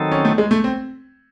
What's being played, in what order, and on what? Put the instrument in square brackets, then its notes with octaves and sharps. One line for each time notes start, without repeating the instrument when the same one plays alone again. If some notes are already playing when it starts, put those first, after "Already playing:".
Already playing: [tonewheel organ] D#3 F#3 C4 D#4 A4
[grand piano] C#4
A3
G#3
A3
C4